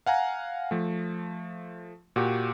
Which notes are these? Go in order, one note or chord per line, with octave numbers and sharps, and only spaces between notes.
F5 F#5 G#5 A#5
F3 A3
A#2 F#4 G4